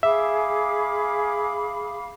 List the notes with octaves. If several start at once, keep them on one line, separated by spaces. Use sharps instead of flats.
G#4 E5 F5 B5 D6